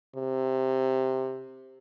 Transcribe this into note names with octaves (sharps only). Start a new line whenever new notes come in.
C3